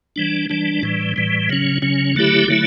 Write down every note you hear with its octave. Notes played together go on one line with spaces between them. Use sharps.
E3 G3 D4
E3 G3 D4
A2 E3 G3
A2 E3 G3
C#3 F#3 C#4
C#3 F#3 C#4
D3 F#3 A3 E4 G4
D3 F#3 A3 E4